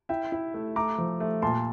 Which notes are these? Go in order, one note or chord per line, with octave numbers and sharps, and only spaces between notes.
E4 E5 G5
E4
A3
A3 A#5 D6
F3
A3
A#2 A5 C6